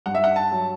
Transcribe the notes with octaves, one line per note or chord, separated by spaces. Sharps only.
G2 F#5
E5
F#5
A5
F#3